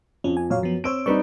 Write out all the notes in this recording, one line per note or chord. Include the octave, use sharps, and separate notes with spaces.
F2 C#4
G#5
F#2 A#2 C#5 F5
F3 B3
C4 C5 C#5 E6 D7
G3 C4 D#4 B4 D5 C#6